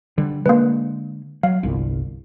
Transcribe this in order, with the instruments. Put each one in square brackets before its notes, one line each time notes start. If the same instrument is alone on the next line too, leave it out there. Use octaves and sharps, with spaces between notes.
[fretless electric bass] D3 G3
[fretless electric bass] D3 G#3 [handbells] A#3 B4
[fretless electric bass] F#3 [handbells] F5
[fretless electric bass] G1 C2